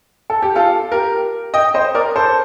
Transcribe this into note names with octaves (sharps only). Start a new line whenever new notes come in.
A4
G4
F4 A4
G4 A#4
D#5 G5
C5 D#5
A#4 D5
A4 C5